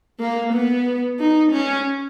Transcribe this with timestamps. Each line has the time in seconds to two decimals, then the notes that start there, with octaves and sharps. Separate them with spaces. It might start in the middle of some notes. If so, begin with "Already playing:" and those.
0.20 A#3
0.53 B3
1.19 D#4
1.52 C#4